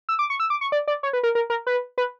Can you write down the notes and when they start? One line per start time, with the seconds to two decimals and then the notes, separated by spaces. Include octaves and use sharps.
0.09 E6
0.19 D6
0.30 C#6
0.40 E6
0.50 D6
0.61 C#6
0.72 D5
0.88 D5
1.03 C#5
1.13 B4
1.23 A#4
1.35 A#4
1.50 A#4
1.67 B4
1.98 B4